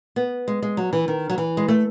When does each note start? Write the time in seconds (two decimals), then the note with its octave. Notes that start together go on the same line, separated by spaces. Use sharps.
0.16 B3
0.48 G#3
0.62 G#3
0.77 F#3
0.93 E3
1.08 D#3
1.29 F#3
1.38 E3
1.57 G#3
1.68 A3